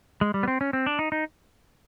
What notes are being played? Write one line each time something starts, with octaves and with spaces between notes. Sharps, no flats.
G#3
G3
B3
C4
C#4
C4
D4
D#4
D#4